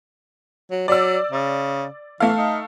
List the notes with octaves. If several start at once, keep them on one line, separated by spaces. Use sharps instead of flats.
F#3
F#3 D5 E6
C#3
E3 A3 A4 F5
D#4